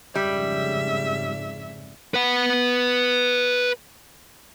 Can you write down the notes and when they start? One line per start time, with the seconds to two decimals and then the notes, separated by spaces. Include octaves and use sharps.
0.15 F2 G#2 C#3 G3 E5
2.14 B4 F#5